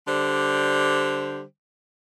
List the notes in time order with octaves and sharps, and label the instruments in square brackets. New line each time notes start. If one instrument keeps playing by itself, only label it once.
[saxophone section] D3 G3 C5